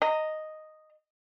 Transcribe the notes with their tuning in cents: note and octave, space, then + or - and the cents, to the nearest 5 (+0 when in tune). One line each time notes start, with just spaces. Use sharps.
D#5 +0 A#5 -20